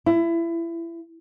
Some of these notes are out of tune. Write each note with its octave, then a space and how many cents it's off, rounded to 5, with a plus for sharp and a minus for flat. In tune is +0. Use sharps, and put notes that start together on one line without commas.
E4 +25